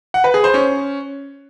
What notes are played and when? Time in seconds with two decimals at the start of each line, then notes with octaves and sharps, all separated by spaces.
0.14 F#5
0.24 B4
0.34 G#4
0.44 C5
0.54 C#4